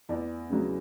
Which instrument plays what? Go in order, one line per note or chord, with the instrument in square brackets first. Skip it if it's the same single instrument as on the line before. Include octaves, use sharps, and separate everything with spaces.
[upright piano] E2 D5
C#3 F#3